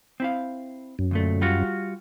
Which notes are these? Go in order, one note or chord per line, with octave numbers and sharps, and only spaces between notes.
C4 E4 F5
F#2
D2 A#2 A3
G3 F4 F#4